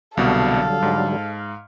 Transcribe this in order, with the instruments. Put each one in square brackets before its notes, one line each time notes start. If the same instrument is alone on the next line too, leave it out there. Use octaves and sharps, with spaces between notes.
[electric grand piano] C2 B2 [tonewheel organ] D3 F#3 G3 [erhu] A4 [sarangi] F5
[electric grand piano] G#2